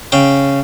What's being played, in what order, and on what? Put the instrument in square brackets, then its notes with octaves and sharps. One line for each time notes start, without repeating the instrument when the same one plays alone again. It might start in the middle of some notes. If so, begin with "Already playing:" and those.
[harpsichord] C#3 G5